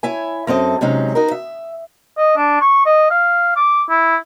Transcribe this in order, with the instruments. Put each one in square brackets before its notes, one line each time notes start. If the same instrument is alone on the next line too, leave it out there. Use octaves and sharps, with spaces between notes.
[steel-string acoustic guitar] E4 C#5 E5 G#5
F#2 C4 A4 D#5
C3 F#3 G#3 C#4 D#4
D#4 F#4 A#4
E5
[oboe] D#5
D4
C#6
D#5
F5
D6
E4